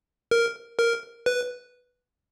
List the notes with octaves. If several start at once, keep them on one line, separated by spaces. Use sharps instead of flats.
A#4
A#4
B4